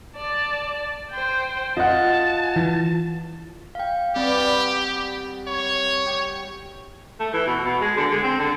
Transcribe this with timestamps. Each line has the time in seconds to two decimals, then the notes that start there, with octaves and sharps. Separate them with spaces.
0.15 D5 A5
1.11 C5 G5
1.77 F4 D#5 F#5 A5
2.56 E3
3.75 F5 G5
4.16 G3 B3 C4 F#4 G4
5.48 C#5
6.06 G4
7.20 A3
7.33 E3
7.47 B2
7.65 B2
7.81 G#3
7.97 D3
8.12 G#3
8.23 C4
8.39 D3